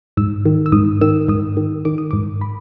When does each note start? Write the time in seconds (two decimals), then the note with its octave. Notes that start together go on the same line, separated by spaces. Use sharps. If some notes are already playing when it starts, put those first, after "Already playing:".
0.17 G#2 E6
0.45 D#3
0.66 E6
0.72 G#2 D#6
1.01 D#3 E6
1.28 G#2 D#6
1.57 D#3
1.85 D#3 D6
1.98 D#6
2.11 G#2 D6
2.41 B5